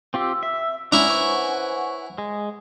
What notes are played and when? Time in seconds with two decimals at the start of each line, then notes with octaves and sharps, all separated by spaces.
0.14 C4 F4 G4 E6
0.43 E5
0.92 C#4 D4 E4 C5 F#5 G#5 A#5
1.09 B4 C#5 C#6
2.18 G#3